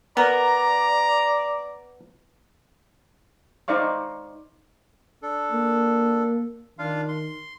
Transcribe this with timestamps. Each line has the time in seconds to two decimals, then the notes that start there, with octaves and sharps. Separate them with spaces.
0.17 B3 A#4 D5 A#5
3.68 D#4 C5 D5 F5 C#6
5.22 D4 A4
5.52 A#3
6.79 D#3 D4 F4 F5
7.08 C6